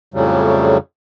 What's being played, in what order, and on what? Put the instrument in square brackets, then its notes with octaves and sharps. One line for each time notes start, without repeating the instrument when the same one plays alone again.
[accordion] F2 A2 C#3 F#3 G3